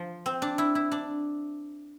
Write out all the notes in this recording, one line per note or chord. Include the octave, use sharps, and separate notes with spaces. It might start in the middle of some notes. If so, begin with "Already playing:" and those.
Already playing: F3
C4
D4
E4
E4
D4